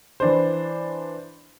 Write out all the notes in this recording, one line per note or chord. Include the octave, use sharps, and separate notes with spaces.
E3 D4 C5